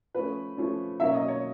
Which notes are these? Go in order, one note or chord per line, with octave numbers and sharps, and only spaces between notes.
F3 A3 C#4 B4
F3 A3 C#4
B2 F#3 A#3 C#4 E5
D#5
C#5